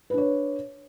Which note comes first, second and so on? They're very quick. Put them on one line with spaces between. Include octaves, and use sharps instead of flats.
B4 D4 C#5